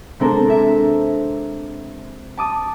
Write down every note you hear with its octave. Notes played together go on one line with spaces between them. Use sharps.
C3 G#3 C4 D4 A4 A#4
E4 E5
A5 D6 D#6